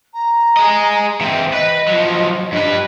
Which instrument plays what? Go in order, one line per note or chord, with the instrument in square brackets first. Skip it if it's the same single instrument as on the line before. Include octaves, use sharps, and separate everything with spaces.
[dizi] A#5
[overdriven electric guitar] G#4 D#5
E3 C4
[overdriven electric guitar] B4 [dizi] D#5
[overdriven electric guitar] F3 F#3
[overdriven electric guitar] G2 B4 [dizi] D#5